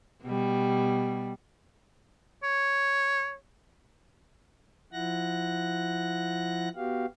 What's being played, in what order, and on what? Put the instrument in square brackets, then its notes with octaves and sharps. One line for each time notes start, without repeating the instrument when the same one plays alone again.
[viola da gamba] B2 G3
[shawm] C#5
[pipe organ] F3 E4 F#5 F#6 A#6
B3 F#4 G4 F5